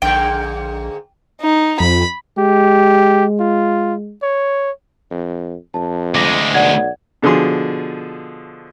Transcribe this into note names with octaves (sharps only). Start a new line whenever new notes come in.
A#1 G#2 D3 A#3 G5
D#4
F2 B5
G#3 G4
F4
C#5
F2
F2 A5
D2 G#3 D6 A#6
B1 D5 F#5 G#6
B2 D3 F3 G#4 C6